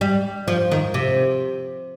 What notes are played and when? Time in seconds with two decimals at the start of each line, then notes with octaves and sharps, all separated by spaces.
0.01 G3
0.48 F3
0.71 D#3
0.94 C3